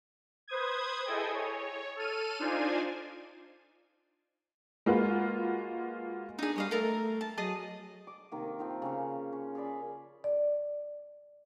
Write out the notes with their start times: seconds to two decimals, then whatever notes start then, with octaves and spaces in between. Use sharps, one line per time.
0.48 B4 C5 D#6 G#6
1.05 E4 G#4 A4 D#5 G5 G#5
1.34 C#5
1.97 A4 F6 D#7
2.39 D4 D#4 F4 C5 D5 G#5
4.86 G#3 A#3 F4 F#4 B4
6.39 D4 D#4 G#4
6.56 G3 C#5 D#5 F5
6.71 A3 A4 A#4 A#5
7.21 A5
7.37 F#3 G#4 D#5 A5
8.07 D6
8.32 C3 D#3 A#3
8.59 D#3 F3 C4
8.82 C#3 A#3 C#4
9.32 C#4
9.55 G#4 C#5 D5 B5
10.24 D5